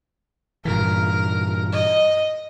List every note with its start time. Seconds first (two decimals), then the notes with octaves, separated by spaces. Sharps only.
0.65 G2 A#2 E3 A#4
1.72 D#5